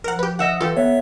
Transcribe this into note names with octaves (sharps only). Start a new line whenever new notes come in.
F3 A#4 F#5
G4 B4
D#5 E5 F#5
E3 F4 G4 A4
B3 C#5 E5